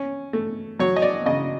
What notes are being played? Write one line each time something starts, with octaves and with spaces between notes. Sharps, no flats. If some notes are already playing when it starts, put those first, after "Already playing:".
Already playing: C#4
A3
F#3 C#5
D#5
D5
C#3 D#5